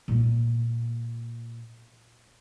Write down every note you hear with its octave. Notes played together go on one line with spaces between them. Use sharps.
A#2 A#3